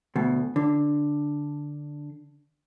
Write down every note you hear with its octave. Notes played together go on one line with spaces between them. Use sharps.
D2 B2
D3